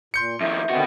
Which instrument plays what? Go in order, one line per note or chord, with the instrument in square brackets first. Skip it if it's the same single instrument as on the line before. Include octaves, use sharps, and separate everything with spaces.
[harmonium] A#2 [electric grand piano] C6 G6 C#7
[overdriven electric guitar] F2 D#3 [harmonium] E4 [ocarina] E5
[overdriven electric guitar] B2 F#4 [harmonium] D3 D#3 C4